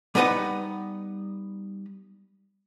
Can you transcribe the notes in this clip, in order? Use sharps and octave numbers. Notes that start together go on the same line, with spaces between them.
G3 B3 D#4 B4 F#5 B5